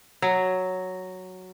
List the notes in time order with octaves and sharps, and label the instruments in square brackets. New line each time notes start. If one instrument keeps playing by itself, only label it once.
[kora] F#3